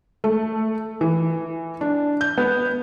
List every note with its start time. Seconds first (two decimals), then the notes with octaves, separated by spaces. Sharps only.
0.24 A3
1.01 E3
1.81 D4
2.21 G6
2.38 B3